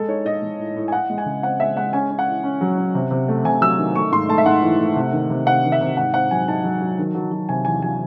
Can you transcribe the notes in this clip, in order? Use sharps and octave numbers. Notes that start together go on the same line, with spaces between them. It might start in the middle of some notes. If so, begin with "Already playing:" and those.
Already playing: G#3 A4
D#4 C#5
D#4 D#5
G#3
A2
A2
G#5
E4 F#5
G#3
G#5
C#3
C4 F#5
G#3 E5
G#3 F#5
C#4 G#5
C#4
F#5
E4
C#4
F#3
C#4
C3
C3
A3
C3 G#5
F#3 E6
D#3
A3 C#6
G#2 C6
A3 A5
E5
G#2 F#5
E3
A3
C3
D#3
C3
C3 F#5
D#3
E5
C3
G#2 F#5
C4 F#5
F#3 G#5
D#4 A5
F#3
F#3
D#3
F#3
F#3
C3 G#5
E2 G#5
F#3 G#5